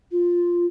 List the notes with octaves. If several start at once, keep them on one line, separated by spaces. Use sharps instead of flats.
F4